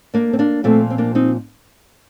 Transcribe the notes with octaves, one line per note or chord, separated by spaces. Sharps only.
A#3 D4
C4
A#3 D4
A#2 F3 A3 C4
C4
A#3 D4
C4 D#4